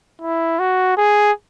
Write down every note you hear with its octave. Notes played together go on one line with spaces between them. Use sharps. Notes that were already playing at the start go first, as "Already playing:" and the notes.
E4
F#4
G#4